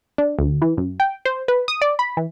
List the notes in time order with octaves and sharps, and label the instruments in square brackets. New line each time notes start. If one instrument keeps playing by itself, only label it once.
[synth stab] D4
D2
E3
F#2
G5
C5
B4
D#6
D5
B5
E3